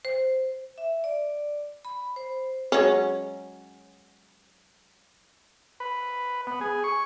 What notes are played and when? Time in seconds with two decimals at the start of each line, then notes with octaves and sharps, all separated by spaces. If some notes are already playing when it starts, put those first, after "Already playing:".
0.05 C5
0.78 E5
1.04 D5
1.85 B5
2.16 C5
2.72 F#3 G#3 C#4
5.80 B4
6.47 B3
6.61 G#4
6.84 C#6